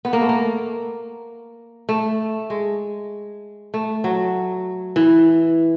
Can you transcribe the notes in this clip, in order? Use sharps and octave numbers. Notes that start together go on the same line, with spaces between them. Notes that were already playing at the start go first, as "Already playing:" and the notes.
B3
A#3
A3
A#3
A3
G#3
A3
F#3
E3